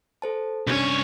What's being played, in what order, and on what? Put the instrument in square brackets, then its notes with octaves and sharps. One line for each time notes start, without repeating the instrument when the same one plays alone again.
[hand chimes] A4 C5 A5
[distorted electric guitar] C2 C#5 [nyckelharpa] C#4 [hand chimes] D4